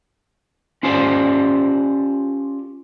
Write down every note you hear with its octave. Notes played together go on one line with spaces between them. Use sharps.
C#4 F4 G4 A4 C5 D5